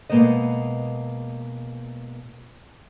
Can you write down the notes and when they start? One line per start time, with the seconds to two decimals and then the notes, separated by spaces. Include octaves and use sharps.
0.09 B2 G#3 A#3 B3 C5 D#5